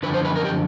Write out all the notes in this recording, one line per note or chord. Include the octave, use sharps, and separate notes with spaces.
F#2 D3 F3 B4
C5
B4
A#4
G4